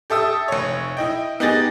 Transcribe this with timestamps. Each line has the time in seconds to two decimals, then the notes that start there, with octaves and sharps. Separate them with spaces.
0.10 G4 A4 E5 D#6 E6
0.48 F1 C#5
0.97 E4 D#5 G5
1.40 B3 D#4 G4 G#4 A6 A#6